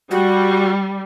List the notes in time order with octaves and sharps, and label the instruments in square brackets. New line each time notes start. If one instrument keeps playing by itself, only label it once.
[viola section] G3 [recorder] F#4